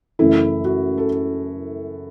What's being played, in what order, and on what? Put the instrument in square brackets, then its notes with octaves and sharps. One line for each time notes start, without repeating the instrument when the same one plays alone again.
[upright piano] F#2 C#3 E3 A3 [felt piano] E4
[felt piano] F#4
A4